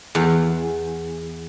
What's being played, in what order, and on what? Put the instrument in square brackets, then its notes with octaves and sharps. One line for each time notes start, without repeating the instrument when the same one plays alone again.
[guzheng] E2